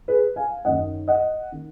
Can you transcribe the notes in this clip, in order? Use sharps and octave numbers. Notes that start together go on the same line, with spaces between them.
G#4 B4
F5 G#5
F#2 D#3 D#5 F#5
D#5 F#5
D#3